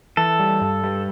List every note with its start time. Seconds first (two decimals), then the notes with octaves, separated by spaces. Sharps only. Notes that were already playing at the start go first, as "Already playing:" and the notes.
0.17 E3 A4
0.39 G3
0.61 G2
0.84 G3